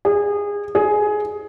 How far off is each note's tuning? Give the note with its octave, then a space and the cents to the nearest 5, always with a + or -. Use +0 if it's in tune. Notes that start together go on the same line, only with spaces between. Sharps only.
G#4 -25
G#4 +15